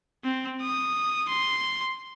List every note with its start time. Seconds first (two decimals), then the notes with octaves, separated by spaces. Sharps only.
0.24 C4
0.61 D#6
1.29 C6